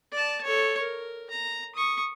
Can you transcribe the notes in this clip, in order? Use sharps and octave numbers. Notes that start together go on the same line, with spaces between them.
D5 A5
A4 C#5
A#4
A#5
C#6 D#6